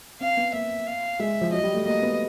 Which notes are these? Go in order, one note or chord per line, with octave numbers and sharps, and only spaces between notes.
C4 F5
B3
A#3 E5
F5
G#3 E5
F3
F#3 D#5
G3
A3
A#3 D#5
B3